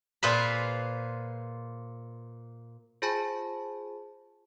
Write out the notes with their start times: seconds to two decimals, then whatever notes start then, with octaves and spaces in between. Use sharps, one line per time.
0.23 A#2 F4 G#4 B4 C5 B5
3.02 F4 G#4 C5 G#5 A5 B5